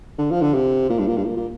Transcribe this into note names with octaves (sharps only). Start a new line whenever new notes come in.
D3
F3
D3
C3
A#2
G2
A#2
G2
A#2
A#2